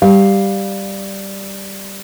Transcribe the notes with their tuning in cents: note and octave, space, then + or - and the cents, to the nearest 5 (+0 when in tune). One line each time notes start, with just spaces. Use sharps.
G3 +0 F5 +0